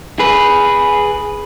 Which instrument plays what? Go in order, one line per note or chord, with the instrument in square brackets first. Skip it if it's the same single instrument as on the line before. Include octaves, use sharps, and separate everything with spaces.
[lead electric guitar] G#4 B4